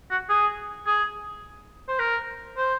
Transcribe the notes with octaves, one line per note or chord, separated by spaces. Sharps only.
F#4
G#4
G#4
C5
A#4
C5